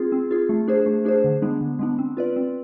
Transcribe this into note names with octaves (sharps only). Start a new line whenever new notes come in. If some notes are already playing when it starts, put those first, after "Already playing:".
Already playing: C4 F4 G#4
C4
F4 G#4
A3
D4 G#4 C5
A3
D4 G#4 C5
D3
G#3 B3 D4
D3
G#3 B3 D4
C4
F4 B4 D5
C4